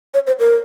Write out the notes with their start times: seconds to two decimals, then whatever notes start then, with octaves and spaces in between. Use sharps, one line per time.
0.14 C#5
0.27 C5
0.39 A#4